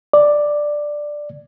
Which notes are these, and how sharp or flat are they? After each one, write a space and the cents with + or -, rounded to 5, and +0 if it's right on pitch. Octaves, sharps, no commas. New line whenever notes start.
D5 +5